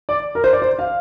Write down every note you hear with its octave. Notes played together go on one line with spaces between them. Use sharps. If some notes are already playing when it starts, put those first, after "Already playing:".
D5
A#4
C5
D5
C5
F5